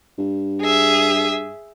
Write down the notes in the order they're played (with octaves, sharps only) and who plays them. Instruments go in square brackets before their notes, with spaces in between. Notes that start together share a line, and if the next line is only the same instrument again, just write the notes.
[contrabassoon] G2
[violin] G#4 E5